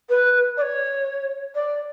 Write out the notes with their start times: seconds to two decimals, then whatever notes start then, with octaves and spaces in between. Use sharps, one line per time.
0.09 B4
0.57 D5
0.61 C#5
1.55 D5